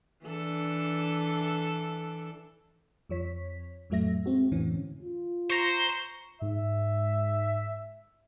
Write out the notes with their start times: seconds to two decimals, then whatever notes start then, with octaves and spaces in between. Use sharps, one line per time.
0.24 E3 D4 A4
3.09 F2 F3 C#5 B6
3.90 F2 A2 F#3 A3 E5 A#6
4.26 G#3 C4 F#4
4.52 F2 A2 D3 E3 C#4
5.02 F4
5.50 C5 A#5 C#6
6.41 G#2 E5